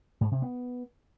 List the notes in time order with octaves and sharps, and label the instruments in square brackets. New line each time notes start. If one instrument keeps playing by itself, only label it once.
[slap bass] G#2
C3
B3